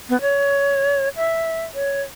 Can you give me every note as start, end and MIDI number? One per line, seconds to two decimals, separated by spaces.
0.09 0.20 59
0.21 1.09 73
1.16 1.64 76
1.74 2.02 73